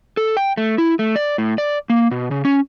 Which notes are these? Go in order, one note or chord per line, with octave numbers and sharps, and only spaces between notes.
A4
G5
A3
E4
A3
D5
A2
D5
A#3
B2
C#3
C#4